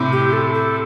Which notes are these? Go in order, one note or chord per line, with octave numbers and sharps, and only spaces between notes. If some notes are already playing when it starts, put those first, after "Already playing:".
Already playing: A2 C3
G4
A4
A4